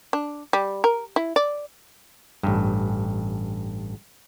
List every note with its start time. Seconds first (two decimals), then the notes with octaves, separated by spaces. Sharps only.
0.13 D4
0.53 G3
0.84 A#4
1.16 E4
1.36 D5
2.43 A1 G2